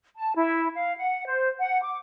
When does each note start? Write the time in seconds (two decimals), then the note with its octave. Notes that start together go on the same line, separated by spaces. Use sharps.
0.15 A5
0.36 E4
0.76 F5
0.97 F#5
1.26 C5
1.59 F#5
1.82 D6